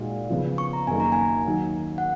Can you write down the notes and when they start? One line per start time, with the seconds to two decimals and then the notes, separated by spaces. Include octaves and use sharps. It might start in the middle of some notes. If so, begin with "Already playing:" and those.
Already playing: A#2 G#3 D#4 F#4
0.30 C#3 F3 B3
0.58 C#6
0.73 A#5
0.87 F#2 D#3 A#3 D#4 G#4 G#5
1.00 A#5
1.12 G#5
1.45 D#2 D#3 F#3
1.98 F#5